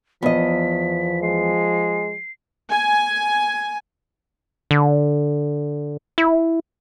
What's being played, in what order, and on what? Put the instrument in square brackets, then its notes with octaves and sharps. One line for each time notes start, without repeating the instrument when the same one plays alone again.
[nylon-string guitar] E2 D#5 [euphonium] F3 [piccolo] B6
[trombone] G#3 [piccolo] C7
[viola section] G#5
[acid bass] D3
E4